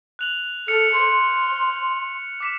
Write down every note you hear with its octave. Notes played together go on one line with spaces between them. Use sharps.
F#6 F7 F#7
A4 F6 C#7 F7
C6
D6 B6 E7